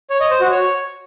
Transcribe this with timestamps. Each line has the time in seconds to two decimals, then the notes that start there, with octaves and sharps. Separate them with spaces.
0.10 C#5
0.20 D#5
0.31 C5
0.41 F#4
0.51 C#5